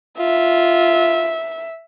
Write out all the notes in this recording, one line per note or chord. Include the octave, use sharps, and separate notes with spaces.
F4 E5